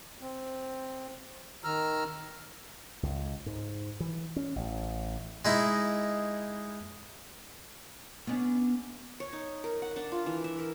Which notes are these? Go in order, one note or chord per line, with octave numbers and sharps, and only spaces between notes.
C4
D#3 A#5 E6 F6
C#2
G#2
E3
C#4
A1
G#3 D#4 E4
B3 C#4 D4
C#5
D#4
A#4
F#5
D4
F4
E3
E5
A#4